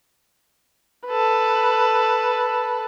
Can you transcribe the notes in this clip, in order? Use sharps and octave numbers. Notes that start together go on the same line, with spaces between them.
A4 B4